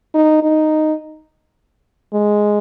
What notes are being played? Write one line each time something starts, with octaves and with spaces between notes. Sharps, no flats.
D#4
D#4
G#3